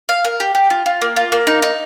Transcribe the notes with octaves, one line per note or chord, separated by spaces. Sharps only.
F5
A#4
G4
G4
F4
F4
A#3
F4
A#3
D#4
D#4